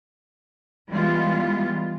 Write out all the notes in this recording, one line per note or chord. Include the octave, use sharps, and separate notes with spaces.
E3 G3 G#3 B3 F4